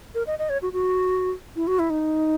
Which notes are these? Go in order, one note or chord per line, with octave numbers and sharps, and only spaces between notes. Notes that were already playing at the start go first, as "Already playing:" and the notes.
A#4
D#5
D#5
C#5
F#4
F#4
E4
F#4
E4
D#4